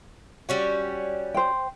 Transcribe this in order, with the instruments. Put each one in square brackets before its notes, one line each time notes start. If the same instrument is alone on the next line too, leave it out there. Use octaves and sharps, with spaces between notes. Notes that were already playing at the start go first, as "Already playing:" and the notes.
[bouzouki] G3 C#4 F#4
[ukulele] C5 G5